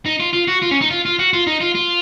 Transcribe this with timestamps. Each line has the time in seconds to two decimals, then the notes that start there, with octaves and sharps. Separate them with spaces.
0.06 D#4
0.20 F4
0.34 F4
0.48 F#4
0.62 F4
0.71 C#4
0.81 D#4
0.91 F4
1.05 F4
1.19 F#4
1.33 F4
1.47 D#4
1.61 F4
1.75 F4